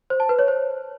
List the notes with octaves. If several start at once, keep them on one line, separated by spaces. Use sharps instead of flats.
C5
A5
B4
C#5
C5